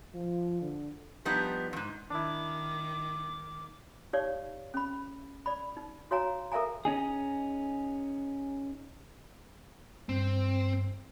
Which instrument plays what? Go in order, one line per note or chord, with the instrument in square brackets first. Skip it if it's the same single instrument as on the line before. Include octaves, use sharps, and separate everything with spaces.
[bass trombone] F3
D3
[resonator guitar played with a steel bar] F3 G3 B3 D#4 G4
F2 G#2
[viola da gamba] D#3 [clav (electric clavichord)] D4 E4 [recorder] D6
[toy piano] D#4 G4 C#5 D5 F5
C#4 B5
D5 B5
D#4
F#4 C#5 F5 G#5 A#5
A4 A#4 E5 F5 G#5 A#5
[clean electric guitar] C#4 D#4 G#4
[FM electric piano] G2 [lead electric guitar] C4